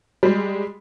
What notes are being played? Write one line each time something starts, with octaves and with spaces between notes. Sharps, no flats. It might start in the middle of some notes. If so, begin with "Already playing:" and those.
G3 G#3